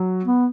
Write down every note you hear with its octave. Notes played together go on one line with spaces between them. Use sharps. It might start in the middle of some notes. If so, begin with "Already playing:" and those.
Already playing: F#3
B3